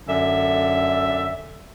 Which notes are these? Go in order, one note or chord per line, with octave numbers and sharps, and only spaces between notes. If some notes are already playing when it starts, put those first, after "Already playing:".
F#2 D3 E5